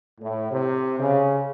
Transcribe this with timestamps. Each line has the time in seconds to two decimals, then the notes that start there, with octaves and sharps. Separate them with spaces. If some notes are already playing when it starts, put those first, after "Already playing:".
0.21 A2
0.51 C3
0.99 C#3